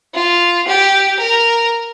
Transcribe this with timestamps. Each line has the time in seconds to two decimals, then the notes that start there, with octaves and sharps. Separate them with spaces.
0.14 F4
0.67 G4
1.19 A#4